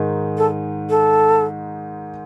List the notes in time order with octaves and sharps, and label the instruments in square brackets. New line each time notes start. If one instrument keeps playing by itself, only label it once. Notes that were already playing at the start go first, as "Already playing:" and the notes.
Already playing: [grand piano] G#2 D#3 G#3
[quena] A4
A4